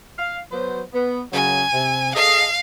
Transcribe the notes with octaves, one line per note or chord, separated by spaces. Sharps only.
F5
F#3 B3 C5
B3
F#2 C#3 F#3 G#5
C3
G#4 A4 D#5 F5 C7